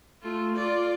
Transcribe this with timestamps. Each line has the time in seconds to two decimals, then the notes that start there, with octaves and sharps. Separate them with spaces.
0.22 A3 F4
0.57 F4 D5